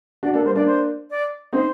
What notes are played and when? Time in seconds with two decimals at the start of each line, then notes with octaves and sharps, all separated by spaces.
0.23 D4 F#4 D5
0.34 A#3 D4 A4
0.45 G3 A#3 C5
0.55 A#3 D4 D5
0.66 C5
1.10 D5
1.53 C4 D#4 C5